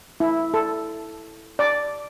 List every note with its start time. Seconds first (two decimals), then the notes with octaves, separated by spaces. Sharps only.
0.20 E4
0.54 A4
1.59 D5